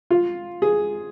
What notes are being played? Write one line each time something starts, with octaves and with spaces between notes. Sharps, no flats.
F4
G#4